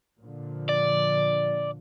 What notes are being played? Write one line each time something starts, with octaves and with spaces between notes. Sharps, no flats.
A#2 D3 F3
D5